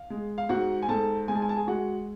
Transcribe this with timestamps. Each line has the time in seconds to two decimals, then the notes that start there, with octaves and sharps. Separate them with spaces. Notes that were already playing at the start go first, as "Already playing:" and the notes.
Already playing: F5
0.10 G#3
0.38 F5
0.49 G#2 F#4 F#5
0.82 G#5
0.89 G#2 A4 A5
1.28 G#3 G#5
1.35 A5
1.42 G#5
1.49 A5
1.56 G#4 G#5
1.67 G#3 F#4 F#5